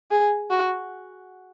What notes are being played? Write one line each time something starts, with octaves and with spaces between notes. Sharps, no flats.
G#4
F#4